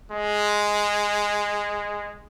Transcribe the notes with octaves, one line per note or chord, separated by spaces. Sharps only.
G#3